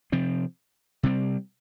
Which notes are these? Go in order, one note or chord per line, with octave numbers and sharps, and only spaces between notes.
C3 F3 C4
C3 G3 C4